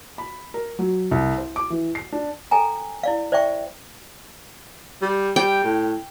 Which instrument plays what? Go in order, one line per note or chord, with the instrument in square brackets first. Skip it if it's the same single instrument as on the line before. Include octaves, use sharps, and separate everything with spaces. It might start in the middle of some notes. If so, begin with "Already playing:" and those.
[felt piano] B5
A#4
F#3
C2
C5
D6
E3
C7
D4
[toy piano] A4 G5 G#5 A#5
E4 D5 F5
C5 D5 E5 G5 C#6
[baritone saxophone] G3
[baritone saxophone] G3 [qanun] G5
[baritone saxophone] A2